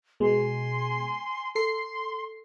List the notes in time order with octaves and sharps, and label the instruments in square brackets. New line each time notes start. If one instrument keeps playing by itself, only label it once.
[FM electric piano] B2 G#3 [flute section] G#5 C6
[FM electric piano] A4 C7 [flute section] C6